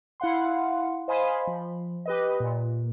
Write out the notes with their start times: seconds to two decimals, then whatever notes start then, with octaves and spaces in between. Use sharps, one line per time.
0.20 E4 F5 F#5 C6
1.08 C5 D#5 F5 G#5 B5 C6
1.47 F3
2.06 G4 B4 D#5
2.40 A#2